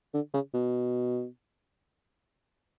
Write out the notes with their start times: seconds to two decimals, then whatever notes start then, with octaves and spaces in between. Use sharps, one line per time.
0.14 D3
0.34 C#3
0.54 B2